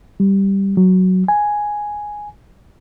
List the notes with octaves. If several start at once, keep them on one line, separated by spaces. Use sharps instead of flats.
G3
F#3
G#5